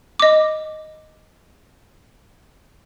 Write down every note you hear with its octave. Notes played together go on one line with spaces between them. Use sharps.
D#5 D6